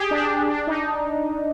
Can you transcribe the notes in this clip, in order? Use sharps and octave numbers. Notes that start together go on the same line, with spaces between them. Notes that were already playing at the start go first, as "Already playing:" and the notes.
Already playing: G4 G#4
D4
D4
D#4